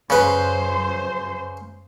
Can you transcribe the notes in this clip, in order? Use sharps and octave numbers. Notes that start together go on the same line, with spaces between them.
F#2 C#3 B4 C5